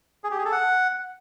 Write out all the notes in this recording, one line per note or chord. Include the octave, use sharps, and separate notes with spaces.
G#4
G4
G#4
A4
F#5